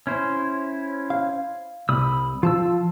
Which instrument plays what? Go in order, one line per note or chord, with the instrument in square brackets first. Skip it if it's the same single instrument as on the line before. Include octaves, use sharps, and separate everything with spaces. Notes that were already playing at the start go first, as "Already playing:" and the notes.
[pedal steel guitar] C#4 E4 C5
[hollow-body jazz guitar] F5
[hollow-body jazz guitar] C2 [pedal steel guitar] B5 D#6 E6
[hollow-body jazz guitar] F3 [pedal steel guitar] F4 A5 E6